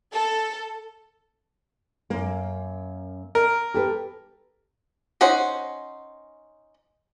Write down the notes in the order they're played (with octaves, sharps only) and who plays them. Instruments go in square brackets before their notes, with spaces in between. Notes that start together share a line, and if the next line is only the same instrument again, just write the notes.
[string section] A4
[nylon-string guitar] F#2 A#3
[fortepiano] A#4
[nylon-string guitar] G4 A4 B4
[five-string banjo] C#4 D#4 C5 F#5